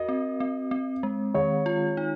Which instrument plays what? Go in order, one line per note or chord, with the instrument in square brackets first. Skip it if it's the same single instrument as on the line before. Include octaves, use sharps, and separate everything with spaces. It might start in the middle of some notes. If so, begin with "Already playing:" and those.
Already playing: [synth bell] F#4 A#4 [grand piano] D#5
[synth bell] C4
C4
C4
G#3
[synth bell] D#3 [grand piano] C#5
[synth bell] F4
D#4